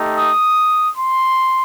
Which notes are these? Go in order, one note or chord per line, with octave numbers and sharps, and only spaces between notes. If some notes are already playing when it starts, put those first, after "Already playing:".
Already playing: A3 D#4 G4
D#6
C6